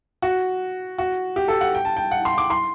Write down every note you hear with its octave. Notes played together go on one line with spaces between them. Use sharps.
F#4
F#4
G4
A4
F#5
G5
A5
G5
F#5
C6
D6
C6